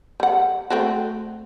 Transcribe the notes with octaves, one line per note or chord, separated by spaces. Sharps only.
G3 F#5
A3 C4 F#4